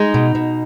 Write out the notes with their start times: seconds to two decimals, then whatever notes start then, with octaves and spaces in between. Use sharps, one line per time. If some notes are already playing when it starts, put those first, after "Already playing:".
Already playing: G#3 D#4
0.14 B2
0.35 B2